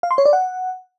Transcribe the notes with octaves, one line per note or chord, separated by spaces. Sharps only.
F5
C6
C#5
D5
F#5